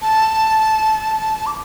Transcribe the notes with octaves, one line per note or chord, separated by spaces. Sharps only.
A5
D6